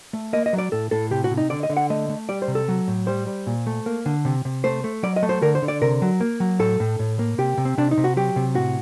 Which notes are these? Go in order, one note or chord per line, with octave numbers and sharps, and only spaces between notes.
A3
A#3 D#5
D#5
F#3
D5
A2 A4
A2 A4
C3 G4
F#4
C3
D#4
D3 D5
D#5
D3
F#5
A3 D#5
A3
G3 D5
C5
C3
A4
F#3
A2
G3 C5
G3
A#2
A3
A#3
D3
C3
C3
A3 C5
A3
F#3 D5
D#5
A3
C5
D3 A#4
C5
D3
D5
C3 A#4
F#3
A#3
F#3
A2 A4
A2
A2
A#3
C3 G4
C3
C4
C3 D4
D#4
C3
F#4
F#3 G4
C3
A2 F#4